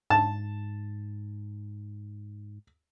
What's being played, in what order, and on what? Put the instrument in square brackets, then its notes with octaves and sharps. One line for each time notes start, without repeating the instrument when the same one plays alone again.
[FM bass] G#2 [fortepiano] A5